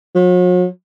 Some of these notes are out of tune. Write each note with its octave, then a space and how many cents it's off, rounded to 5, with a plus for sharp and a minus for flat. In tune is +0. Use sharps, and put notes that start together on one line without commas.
F#3 -45